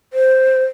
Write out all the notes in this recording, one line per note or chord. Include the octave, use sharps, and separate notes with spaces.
C5